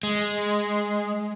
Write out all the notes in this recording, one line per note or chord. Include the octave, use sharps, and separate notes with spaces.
G#3